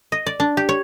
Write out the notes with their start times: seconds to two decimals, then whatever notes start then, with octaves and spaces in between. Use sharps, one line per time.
0.12 D#5
0.26 D5
0.40 D4
0.57 G4
0.69 C#5